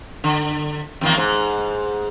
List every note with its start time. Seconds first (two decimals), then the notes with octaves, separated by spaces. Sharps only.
0.24 D3
1.01 E2 D#3 A#3
1.17 G#2